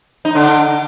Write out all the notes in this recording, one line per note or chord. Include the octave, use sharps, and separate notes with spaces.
D#4
D3 D4